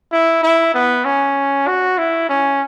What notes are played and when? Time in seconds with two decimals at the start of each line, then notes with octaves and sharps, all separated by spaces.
0.12 E4
0.43 E4
0.74 B3
1.05 C#4
1.67 F#4
1.98 E4
2.29 C#4